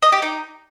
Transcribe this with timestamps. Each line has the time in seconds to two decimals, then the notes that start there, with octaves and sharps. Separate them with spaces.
0.02 D#5
0.12 G4
0.22 D#4